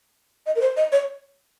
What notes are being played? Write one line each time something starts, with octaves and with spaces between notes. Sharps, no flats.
D#5
A#4
C5
D#5
C#5